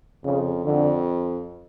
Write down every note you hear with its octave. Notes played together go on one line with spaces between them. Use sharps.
F2 C#3
F2 D3